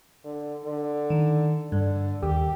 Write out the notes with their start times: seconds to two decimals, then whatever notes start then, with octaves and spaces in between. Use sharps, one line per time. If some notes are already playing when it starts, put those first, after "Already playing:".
0.25 D3
0.65 D3
1.10 D#3
1.72 G2 D3
2.23 D#2 G4